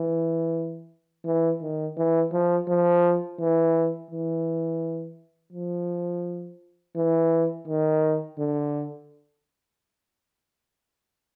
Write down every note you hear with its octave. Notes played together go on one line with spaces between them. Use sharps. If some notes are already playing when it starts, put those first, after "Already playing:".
Already playing: E3
E3
D#3
E3
F3
F3
E3
E3
F3
E3
D#3
D3